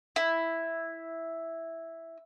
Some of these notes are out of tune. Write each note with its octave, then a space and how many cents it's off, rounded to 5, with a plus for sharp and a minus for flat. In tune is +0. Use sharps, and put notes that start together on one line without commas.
E4 +0